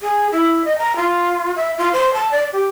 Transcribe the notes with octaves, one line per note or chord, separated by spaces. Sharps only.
G#4
E4
D#5
A#5
F4
E5
F4
C5
A5
D5
G4